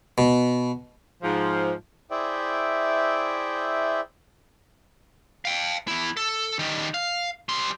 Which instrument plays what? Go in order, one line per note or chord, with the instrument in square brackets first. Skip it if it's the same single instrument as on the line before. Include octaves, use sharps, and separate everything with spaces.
[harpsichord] B2
[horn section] G#2 F3
[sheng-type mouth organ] E4 G#4 C5 D5 E5 G5
[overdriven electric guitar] F5 G5
E2 E4
A4
D#3 G3
F5
G3 C6